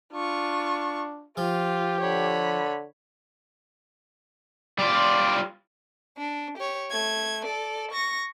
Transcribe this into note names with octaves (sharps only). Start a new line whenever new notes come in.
D4 F4 C#6
F3 F4 G4
D3 C#5 B5
G3 F4 D5
D4
G4 C#5
A3 G#6
A4 D5
C#6 A#6